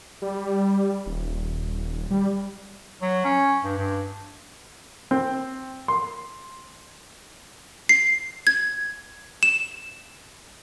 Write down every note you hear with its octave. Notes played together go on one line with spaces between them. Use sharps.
G3
D#1
G3
F#3
C#4
G2
G2
C4
C6
C7
G#6
E7